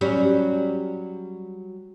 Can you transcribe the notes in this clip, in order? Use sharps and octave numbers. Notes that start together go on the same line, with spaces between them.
F#3 G3 C#4